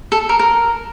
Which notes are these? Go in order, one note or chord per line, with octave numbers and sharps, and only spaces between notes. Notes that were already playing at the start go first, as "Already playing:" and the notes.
A4
A#4
A#4